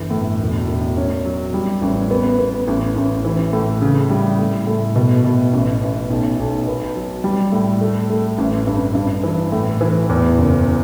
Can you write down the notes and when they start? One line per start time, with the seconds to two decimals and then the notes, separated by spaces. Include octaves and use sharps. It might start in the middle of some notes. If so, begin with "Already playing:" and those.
Already playing: G1 E3
0.10 A2
0.39 E1
0.68 E1
0.97 C#4
1.25 F#3
1.54 G3
1.82 A1
2.11 B3
2.39 B3
2.67 A1
2.96 A1
3.25 E3
3.53 A2
3.82 C#3
4.10 G3
4.39 A2
4.67 A2
4.96 B2
5.24 B2
5.53 A1
5.82 A1
6.10 B1
6.39 B1
6.67 B3
6.96 F#3
7.24 G3
7.52 A2
7.81 A3
8.10 A3
8.38 A1
8.67 G2
8.95 G2
9.23 E3
9.52 A2
9.81 E3
10.09 E2
10.38 F#1